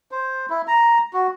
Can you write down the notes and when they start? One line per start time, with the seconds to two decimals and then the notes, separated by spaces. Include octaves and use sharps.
0.11 C5
0.50 E4
0.67 A#5
1.13 F#4